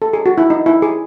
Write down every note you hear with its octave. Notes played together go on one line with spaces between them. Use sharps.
A4
G#4
F#4
E4
D#4
E4
G#4